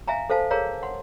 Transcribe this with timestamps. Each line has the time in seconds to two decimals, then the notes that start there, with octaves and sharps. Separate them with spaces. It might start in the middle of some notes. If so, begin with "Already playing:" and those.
0.08 E5 F5 G#5 A#5
0.30 A4 C5 F5 A5
0.51 G#4 A#4 C#5 F5 A#5
0.83 F#5 C6